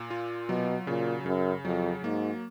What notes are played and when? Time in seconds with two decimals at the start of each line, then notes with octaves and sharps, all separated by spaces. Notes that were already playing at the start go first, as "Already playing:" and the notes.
Already playing: A#2 A#3
0.10 F4
0.49 B2 F#3
0.87 A#2 C#3
1.26 F#2 C#3
1.64 F2 F#3
2.04 G#2 A#3